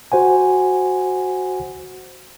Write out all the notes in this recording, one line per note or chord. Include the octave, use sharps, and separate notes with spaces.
F#4 C5 F#5 G#5